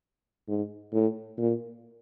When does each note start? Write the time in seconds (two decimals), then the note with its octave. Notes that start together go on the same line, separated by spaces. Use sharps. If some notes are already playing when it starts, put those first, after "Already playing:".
0.48 G#2
0.93 A2
1.38 A#2